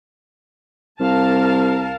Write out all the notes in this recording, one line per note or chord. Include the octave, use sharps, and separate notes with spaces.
C2 A#4 F5 A5